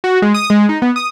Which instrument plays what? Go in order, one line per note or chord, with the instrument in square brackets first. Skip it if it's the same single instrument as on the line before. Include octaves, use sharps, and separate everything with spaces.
[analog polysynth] F#4
G#3
D#6
G#3
D#4
B3
D#6